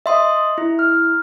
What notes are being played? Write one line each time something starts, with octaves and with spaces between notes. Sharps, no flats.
D#5 E5 C6 D#6
E4
F6